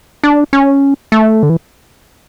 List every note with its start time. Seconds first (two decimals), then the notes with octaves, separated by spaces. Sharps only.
0.24 D4
0.53 C#4
1.12 A3
1.43 D3
1.50 E3